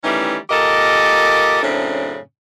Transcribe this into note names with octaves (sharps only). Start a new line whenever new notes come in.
D#3 E3 G3 A3 C#4
A#2 G4 A4 A#4 D#5
F#2 A2 C#3 C4 D4